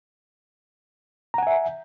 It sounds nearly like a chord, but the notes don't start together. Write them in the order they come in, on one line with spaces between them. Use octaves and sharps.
A#5 F#5 G#5 E5